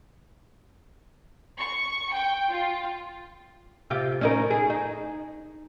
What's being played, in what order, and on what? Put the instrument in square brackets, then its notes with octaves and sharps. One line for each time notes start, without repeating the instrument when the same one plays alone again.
[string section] C#6
G5
F4
[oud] C3 F4 G4
C#4 D#4 A#4
G#4
D#4